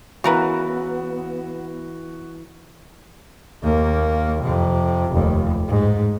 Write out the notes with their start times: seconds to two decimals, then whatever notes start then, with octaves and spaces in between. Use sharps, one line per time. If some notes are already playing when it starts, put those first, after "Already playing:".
0.24 C#3 E3 B3 E4 F#4 A#4 B4
3.63 D#2 A#3
4.42 F2 C3
5.12 F1 D#2
5.68 G#2